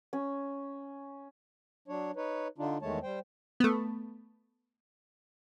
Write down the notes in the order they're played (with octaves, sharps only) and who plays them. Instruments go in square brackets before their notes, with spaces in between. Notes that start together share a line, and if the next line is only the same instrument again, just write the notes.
[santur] C#4
[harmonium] F#3 D4 C#5
D#4 B4 C#5
D3 D4 D#4 F4
E2 D#3 G#3 A3 C#5 A5
G3 C5 G5
[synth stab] A3 B3